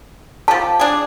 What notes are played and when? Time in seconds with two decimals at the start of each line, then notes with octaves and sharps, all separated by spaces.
0.48 F3 G4 A5
0.80 D4 G#4